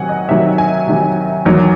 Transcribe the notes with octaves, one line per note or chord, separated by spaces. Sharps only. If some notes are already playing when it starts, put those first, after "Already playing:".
Already playing: C3 D#3 F#3 F#5 G#5
D#5
C3 D#3 F#3 E5
G#5
C3 D#3 F#3
E2 D#3 F#3